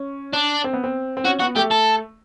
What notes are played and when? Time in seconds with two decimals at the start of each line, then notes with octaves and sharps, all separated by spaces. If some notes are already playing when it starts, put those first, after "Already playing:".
Already playing: C#4
0.33 D4
0.64 C4
0.73 B3
0.84 C4
1.17 C4
1.25 C#4 F#4
1.40 B3 F#4
1.56 A3 G4
1.71 A4